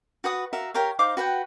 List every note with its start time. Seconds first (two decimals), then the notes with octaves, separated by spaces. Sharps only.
0.24 F#4 B4 F#5 D#6
0.53 F#4 A#4 E5 F5
0.74 G4 A#4 C#5 F5
0.99 D#4 C5 F5 D6
1.17 F#4 B4 F#5 G5